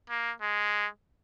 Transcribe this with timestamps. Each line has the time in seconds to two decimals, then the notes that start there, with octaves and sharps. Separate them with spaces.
0.09 A#3
0.41 G#3